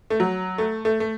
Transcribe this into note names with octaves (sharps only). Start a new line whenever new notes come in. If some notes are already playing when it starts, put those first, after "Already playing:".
A3
F#3
A3
A3
A3